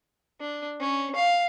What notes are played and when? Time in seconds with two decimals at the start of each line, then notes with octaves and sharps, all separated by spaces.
0.40 D4
0.80 C#4
1.15 F5